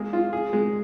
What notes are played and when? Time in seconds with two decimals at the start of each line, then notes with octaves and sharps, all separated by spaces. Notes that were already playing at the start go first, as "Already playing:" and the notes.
Already playing: G#3 A#3
0.13 F4
0.33 G#4
0.53 G#3